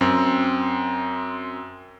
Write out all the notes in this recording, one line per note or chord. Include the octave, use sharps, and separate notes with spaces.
F#2 C4